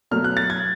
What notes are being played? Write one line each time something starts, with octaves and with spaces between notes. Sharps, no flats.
B2 F#3 A3 F6
F#6
A6
G#6